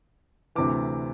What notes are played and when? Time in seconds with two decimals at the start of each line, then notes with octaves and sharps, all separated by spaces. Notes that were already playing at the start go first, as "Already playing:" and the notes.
0.55 D2 C3 E3 D6